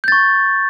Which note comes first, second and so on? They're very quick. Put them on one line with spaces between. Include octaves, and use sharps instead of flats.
G6 A6 C#6